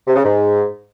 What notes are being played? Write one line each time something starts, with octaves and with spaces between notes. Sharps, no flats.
C3
C#3
G#2